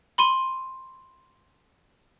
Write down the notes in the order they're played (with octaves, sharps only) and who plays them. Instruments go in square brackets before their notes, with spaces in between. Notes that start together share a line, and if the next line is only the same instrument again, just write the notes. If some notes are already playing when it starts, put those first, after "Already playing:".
[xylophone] B5 C6 D#7